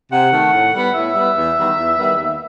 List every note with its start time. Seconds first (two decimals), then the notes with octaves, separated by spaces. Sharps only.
0.11 C3 F#5
0.32 D#3 A3
0.53 A2
0.73 G3 B3
0.94 A2 E5
1.14 G3 B3
1.35 E2
1.56 D#3 G3 B3
1.76 E2
1.97 D#3 G3 B3
2.18 D#2